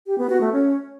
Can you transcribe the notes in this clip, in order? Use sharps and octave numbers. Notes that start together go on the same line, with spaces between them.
G4
B3
F#4
A3
C#4